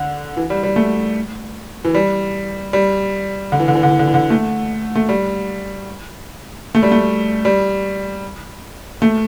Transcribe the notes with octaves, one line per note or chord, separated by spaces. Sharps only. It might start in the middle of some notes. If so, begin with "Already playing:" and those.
Already playing: D3
E3
G3
G3
A3
E3
G3
G3
D3
E3
D3
E3
D3
E3
D3
E3
D3
A3
A3
G3
A3
G3
A3
G3
A3